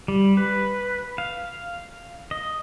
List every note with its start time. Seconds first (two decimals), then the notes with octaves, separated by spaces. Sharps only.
0.08 G3
0.37 B4
1.18 F5
2.31 D#5